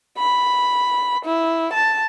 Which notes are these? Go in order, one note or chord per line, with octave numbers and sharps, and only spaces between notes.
B5
E4
A5